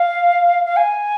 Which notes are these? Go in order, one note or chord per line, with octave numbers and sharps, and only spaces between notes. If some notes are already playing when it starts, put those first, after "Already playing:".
Already playing: F5
F5
G#5